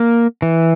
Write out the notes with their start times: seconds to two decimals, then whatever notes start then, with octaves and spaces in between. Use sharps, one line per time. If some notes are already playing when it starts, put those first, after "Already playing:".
Already playing: A#3
0.42 E3